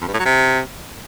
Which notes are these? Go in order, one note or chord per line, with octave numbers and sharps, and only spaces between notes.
F2
G2
A2
F#3
C3